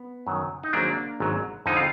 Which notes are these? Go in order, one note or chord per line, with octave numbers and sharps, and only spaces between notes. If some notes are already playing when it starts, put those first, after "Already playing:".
Already playing: B3
F#2 D#3 F#3
D#4
G#1 G#2 F#3 A#3 D4
G#1 G#2 F#3
F2 D3 F3 G#3 D#4
F4